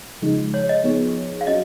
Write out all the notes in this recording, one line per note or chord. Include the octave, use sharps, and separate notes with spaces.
C#3 F3 G#3 D#4
C#5
D#5
F3 B3 D#4 G#4 C#5
F5
F#3 C#4 F#4 D#5